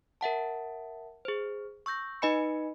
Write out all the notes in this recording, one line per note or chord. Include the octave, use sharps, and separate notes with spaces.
A#4 E5 F#5 A5
G#4 C5
C#6 E6 G6 A#6
D#4 B4 D#5 G#5 B5 C#7